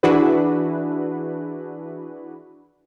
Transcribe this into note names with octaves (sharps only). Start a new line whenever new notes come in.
E3 D4 E4 F#4 G#4 B4